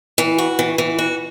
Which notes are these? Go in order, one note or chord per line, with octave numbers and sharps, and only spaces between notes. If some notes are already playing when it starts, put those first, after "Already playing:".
E3
F#4
E3
E3
F#4